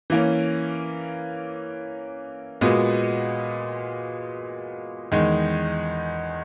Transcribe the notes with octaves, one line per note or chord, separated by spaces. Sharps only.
E3 A#3 C#4
A#2 G#3 B3 F#4
E2 D#3 G#3 D#4